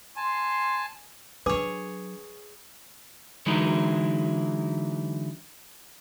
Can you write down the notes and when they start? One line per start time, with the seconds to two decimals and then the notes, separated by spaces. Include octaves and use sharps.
0.16 G#5 A5 C6
1.46 F#3 D4 G#4 B4 C#5 D6
3.46 D3 E3 F#3 G#3 D#4 E4